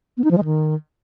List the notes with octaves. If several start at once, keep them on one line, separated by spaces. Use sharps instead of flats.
B3
D#4
F3
G#3
D#3